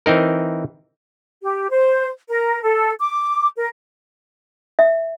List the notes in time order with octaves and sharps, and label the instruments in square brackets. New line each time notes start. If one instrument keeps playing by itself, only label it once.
[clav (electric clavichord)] E3 C4 D#4 A#4
[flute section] G4
C5
A#4
A4
D6
A#4
[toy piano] E5